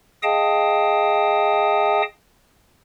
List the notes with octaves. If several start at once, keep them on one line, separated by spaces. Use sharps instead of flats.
G#4 D#5 F5 G5 A5 D#6